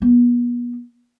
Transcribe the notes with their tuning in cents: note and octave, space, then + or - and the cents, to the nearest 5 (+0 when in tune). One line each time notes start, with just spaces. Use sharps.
B3 -35